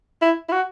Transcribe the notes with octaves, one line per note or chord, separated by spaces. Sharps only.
E4
E4
F#4